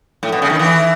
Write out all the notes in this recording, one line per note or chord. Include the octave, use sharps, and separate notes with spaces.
A2
B2
C#3
D#3
E3